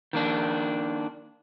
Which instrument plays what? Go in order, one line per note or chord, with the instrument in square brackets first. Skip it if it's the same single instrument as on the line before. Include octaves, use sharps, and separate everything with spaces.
[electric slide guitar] D#3 A#3 D4